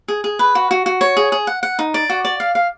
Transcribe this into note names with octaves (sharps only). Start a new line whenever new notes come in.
G#4
G#4
B4
F#4
F#4
F#4
C#5
G#4
G#4
F#5
F#5
D#4
D5
F#4
D5
F5
F5